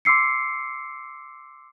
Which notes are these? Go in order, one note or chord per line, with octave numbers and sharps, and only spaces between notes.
C6 D6 E6 C7 C#7